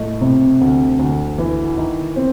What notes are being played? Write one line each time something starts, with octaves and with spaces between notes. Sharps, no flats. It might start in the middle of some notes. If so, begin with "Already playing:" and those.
Already playing: A2 A3 D#5
C3
D2
D2
E3
D#3
C4